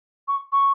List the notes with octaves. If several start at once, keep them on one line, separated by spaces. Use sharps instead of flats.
C#6
C#6